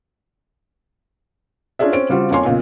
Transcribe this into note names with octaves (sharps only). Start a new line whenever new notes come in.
C#4 D4 F4 G#4 D5 E5
C4 C#4 D7
C#3 G3 C4 F4 F#4
F2 A#3 C#4 C#5 G#5 C6
B1 A#2 C#3